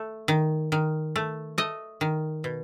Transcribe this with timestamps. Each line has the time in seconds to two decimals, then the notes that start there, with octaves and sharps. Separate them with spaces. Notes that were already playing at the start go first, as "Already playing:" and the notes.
Already playing: A3
0.28 D#3
0.72 D#3
1.16 A3
1.58 A3 D#5
2.01 D#3
2.44 B2